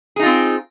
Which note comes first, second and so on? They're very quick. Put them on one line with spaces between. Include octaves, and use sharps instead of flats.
G#4 D#4 F4 C4